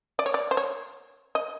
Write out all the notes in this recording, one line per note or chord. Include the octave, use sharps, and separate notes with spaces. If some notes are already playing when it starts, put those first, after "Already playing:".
D5
C#5
D5
C5
C#5
D#5